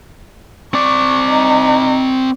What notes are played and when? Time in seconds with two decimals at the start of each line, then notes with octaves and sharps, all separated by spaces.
0.74 C4 D5 C#6
1.27 D#4